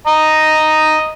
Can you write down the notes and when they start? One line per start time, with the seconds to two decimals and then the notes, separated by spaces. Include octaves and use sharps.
0.07 D#5 A#5